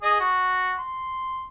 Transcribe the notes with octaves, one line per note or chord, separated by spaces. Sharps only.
G#4 D#5
F#4
C6